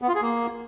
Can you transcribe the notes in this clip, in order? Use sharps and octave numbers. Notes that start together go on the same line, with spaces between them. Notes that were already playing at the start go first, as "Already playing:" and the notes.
B3
F4
G#4
A#3